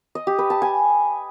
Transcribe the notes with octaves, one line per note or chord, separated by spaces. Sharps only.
D#5
G4
B4
A5
G#5